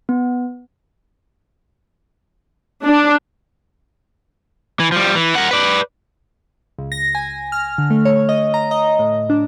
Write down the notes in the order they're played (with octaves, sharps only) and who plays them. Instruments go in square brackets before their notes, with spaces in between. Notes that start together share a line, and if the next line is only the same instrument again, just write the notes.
[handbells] B3
[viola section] D4
[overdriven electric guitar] E3
F3 G3
E3
A#4 F#5
B4 D5
[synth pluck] C#2
A#6
G#5
F6
D3
A3
C#5
D#5
A#5
D#5
A2
D4